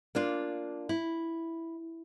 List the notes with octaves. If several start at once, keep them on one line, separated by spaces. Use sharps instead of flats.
A#3 D4 F4
E4